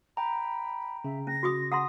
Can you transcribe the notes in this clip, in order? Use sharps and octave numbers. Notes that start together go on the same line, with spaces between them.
G5 A#5 B5
C#3 E5
C#4 A#6
F#4 D6 D#6
F#5 A#5 C6 D#6 A#6